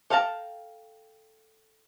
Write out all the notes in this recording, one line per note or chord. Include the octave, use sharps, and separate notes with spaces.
A4 F5 G5 A5 A#5